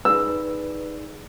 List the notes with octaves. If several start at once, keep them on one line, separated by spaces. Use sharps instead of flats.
D#4 G#4 B4 D5 E6